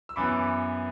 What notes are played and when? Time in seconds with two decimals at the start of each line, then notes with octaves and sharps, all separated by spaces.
0.09 E6
0.16 F#2 E3 B3 B5 D6